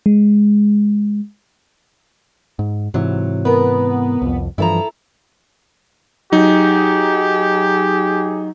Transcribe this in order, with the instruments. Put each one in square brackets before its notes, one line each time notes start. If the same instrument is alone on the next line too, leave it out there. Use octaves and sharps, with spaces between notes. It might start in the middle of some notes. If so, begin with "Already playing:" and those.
[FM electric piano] G#3
[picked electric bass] G#2
[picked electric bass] G#2 C3 E3 [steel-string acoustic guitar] F#3
[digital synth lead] B3 [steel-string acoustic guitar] A#4 B4
[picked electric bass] C2 F2
[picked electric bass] G2 E3 F3 [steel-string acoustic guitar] E4 A4 A#5
[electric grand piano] F#3 D#4 [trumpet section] G4 G#4